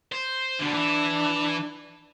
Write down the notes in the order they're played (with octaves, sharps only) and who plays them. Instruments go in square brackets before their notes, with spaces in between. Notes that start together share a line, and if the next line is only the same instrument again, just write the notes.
[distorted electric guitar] C5
[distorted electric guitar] B2 D3 [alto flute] D4
[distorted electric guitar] E3 E4